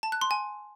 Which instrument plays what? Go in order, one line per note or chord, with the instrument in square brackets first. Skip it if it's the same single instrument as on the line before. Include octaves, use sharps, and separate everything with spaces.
[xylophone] A5
F#6
C6
G#5